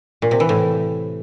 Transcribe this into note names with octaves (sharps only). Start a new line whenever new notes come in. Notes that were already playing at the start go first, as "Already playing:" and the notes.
A#2
C3
E3
A2